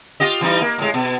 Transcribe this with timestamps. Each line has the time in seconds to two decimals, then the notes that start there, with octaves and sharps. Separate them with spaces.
0.20 F4 G4 D#5
0.41 E3 G3 D#4
0.61 A#3
0.78 A2 G#3
0.94 B2